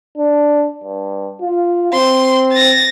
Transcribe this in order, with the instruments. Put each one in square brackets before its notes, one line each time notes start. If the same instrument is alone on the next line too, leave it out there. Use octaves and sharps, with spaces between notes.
[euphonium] D4
G2
F4
[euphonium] C4 [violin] C6
[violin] A6 A#6